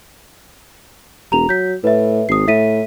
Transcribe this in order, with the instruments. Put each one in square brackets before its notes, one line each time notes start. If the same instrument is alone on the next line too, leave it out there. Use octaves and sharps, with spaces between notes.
[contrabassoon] E1 [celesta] A#5 F7
[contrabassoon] F#3 [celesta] G6 B6
[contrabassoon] A2 [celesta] B4 E5
[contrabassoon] G#1 [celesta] D#6 C7
[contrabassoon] A2 [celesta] E5 B6 D#7